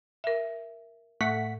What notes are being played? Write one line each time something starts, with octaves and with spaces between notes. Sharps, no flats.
A#4 E5
A2 A3 F#5 B6